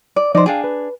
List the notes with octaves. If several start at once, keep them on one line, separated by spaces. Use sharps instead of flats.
D5
F3 D#4 C5 D5 D#5
D4 G#4 F5 G5 G#5
B4